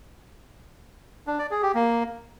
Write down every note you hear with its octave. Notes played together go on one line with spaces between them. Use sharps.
D4
D5
G#4
G4
A#3